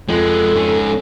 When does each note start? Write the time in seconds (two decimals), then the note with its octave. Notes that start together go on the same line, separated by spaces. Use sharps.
0.09 F2 G#3 B3 A4
0.54 G#2 C#4